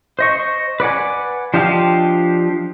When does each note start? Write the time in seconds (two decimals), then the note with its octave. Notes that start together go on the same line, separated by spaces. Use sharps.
0.19 C5 D#5 C#6
0.80 B4 D5 F#5 G#5
1.54 F3 D4 G4 D#5 F5